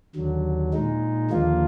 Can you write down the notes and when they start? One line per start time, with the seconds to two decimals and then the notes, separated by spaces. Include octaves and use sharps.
0.15 D#2 D3 F#3
0.73 A#2 G#3 D#4
1.31 D#2 D3 F3 A#3 F4